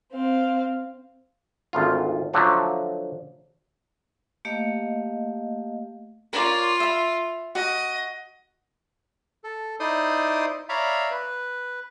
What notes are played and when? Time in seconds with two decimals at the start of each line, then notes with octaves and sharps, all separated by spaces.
0.13 C4 F5
1.73 G#1 D2 F4
2.34 D3 F3 F#3 A3
4.45 A3 A#3 G4 D#5 F5
6.33 F4 A#4 C#5 D5
6.80 E5 B5
7.55 F#4 D#5
9.44 A4
9.80 D#4 E4 C5 D5 C6 D#6
10.69 C#5 D5 E5 F5 A#5 B5
11.10 B4